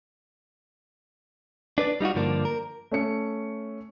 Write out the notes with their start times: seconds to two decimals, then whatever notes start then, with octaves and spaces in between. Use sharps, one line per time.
1.78 D4 B4 D5
2.00 G3 D#4 F4 F#4
2.15 G2 D3 F3 A#3 D4
2.45 A#4
2.91 A3 C#4 C#7